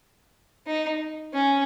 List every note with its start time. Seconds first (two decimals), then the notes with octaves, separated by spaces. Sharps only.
0.67 D#4
1.33 C#4